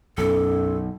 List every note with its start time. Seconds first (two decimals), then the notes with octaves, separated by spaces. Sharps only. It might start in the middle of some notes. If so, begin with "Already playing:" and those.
0.18 B1 F#2 A4